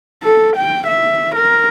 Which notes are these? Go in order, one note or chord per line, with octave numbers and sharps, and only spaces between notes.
A4
G5
E5
A#4